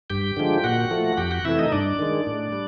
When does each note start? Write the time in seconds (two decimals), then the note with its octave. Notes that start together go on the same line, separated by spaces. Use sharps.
0.10 G2 G4 G5
0.37 D3 F3 G#3
0.64 A#2 F#4 F#5
0.91 F3 A3
1.17 F2 G4 G5
1.31 F#4 F#5
1.45 C3 E3 A3 E4 E5
1.58 D#4 D#5
1.72 G2 D4 D5
1.99 D#3 G#3
2.26 A2
2.52 G3